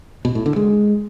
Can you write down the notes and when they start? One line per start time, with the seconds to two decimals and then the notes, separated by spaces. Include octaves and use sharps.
0.25 B2
0.35 A2
0.46 D3
0.56 G#3